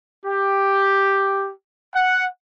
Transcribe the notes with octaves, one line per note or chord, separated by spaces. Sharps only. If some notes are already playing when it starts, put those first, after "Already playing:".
G4
F#5